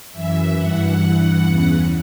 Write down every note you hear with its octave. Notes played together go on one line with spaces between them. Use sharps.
F#2 E3 E5
G2 E3 F#5
G2 E3
E2 C#3 E3